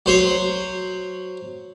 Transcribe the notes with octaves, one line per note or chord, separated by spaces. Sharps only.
F#3 C5 C#5